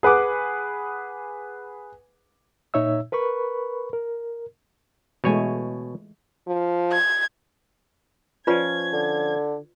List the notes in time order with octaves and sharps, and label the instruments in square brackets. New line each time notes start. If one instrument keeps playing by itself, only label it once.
[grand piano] G#4 B4 F#5 D6
[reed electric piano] A#2 D#4 C#5 E5 E6
A#4 B4 B5 C#6
A#4
[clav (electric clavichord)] B2 C#5 G#5 [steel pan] E3 G#3 A3
[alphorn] F3
[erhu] G#6
[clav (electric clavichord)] F3 C#4 [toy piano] F4 B4 D5 [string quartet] G#6
[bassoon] D3